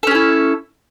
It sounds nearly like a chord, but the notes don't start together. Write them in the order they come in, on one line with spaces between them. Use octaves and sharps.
A4 C#4 G#4 E4